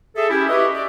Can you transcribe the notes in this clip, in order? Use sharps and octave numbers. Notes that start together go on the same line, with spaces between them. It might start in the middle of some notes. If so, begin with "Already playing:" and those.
G#4 A4 E5
C#4 E4 G4
F#4 G4 B4 D#5 E5
D5